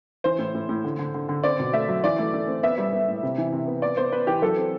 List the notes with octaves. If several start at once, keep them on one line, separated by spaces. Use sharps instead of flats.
E3 C5
A2
A2
A2
D3
D3
D3
D3
C4 D5
B2
A3 E5
F#3
E3 D5
A3
A3
C4
B3 E5
G3
B3
A2
C3
E3
C3
B3
B3 D5
B3 C5
B3 B4
E3 G4
F#3 A4
C4